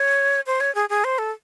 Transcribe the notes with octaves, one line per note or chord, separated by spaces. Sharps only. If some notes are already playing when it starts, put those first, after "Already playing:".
Already playing: C#5
C5
C#5
G#4
G#4
C5
A4